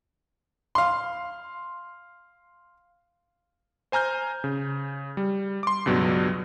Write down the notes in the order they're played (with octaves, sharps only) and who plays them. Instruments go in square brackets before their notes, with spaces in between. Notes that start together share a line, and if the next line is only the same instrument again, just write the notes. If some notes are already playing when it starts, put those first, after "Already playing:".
[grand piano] F5 C6
[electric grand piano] C5 G#5 A#5 F6 G6
C#3
G3
C6 D6
C#2 G2 B2 F#3